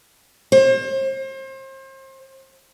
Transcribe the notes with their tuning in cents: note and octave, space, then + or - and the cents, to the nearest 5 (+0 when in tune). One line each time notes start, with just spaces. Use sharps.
C5 +35